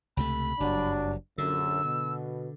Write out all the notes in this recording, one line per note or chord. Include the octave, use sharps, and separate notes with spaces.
C#2 C3 A3 B5
F#1 G2 F#3 G3 D4
A#1 F#2 D3 E6
B2